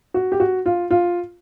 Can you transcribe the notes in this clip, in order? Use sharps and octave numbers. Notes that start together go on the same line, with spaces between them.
F#4
G4
F#4
F4
F4